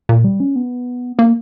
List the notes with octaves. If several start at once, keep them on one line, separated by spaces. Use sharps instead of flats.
A#2
G3
C#4
B3
A#3